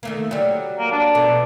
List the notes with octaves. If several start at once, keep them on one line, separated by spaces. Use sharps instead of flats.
D#3 A3 A#3
F#3 G3
A#3
D4
B2 A3